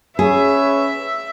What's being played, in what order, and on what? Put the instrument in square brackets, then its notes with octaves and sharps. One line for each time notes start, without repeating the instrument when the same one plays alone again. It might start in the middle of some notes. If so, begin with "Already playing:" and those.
[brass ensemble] C#4 B4 C#5 [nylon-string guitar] G#4 [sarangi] E5